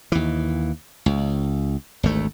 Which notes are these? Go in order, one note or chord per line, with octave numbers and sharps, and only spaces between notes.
D#2 E3
C#2
G#1 D2 A3